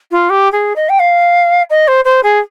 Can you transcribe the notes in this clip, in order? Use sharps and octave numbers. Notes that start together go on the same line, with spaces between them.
F4
G4
G#4
D#5
G5
F5
D#5
C5
C5
G#4